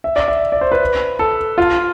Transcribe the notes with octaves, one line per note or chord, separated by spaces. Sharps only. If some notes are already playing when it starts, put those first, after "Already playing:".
E5
D5
E5
D5
C5
B4
A4
F4